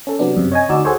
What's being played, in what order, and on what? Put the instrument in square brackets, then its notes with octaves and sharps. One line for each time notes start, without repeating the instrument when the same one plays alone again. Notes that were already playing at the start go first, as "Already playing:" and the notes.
[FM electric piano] C#4 A4
C3 F#3 B3 D4
F#2 C3
C#5 D#5 G#5
D2 D#4 F#4 D5 E6
F#4 G#4 A4 C5 C#5